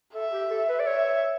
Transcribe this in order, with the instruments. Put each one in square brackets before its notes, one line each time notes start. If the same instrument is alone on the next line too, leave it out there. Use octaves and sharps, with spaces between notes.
[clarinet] A4 [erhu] E5
[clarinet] G4
A4
B4
D5
[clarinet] C#5 [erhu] E5